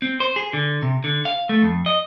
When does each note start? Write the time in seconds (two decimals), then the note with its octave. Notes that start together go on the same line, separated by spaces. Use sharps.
0.02 C4
0.20 C5
0.36 G#4
0.53 D3
0.82 C3
1.04 D3
1.25 F5
1.49 A3
1.62 F2
1.86 D#5